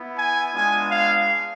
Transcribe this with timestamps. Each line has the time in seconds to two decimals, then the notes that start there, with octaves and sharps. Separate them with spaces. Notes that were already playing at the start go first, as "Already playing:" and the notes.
Already playing: B3 E4
0.17 G#5
0.54 G#3 B3 D4 F4 G#5
0.90 F5